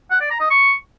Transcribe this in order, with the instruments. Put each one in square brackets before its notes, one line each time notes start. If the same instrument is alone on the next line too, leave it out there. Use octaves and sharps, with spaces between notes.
[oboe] F#5
D5
A#5
D#5
C#6